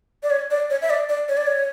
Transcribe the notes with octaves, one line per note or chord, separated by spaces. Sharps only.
D5
C#5
D5
C#5
E5
D5
D5
C#5
D5
C#5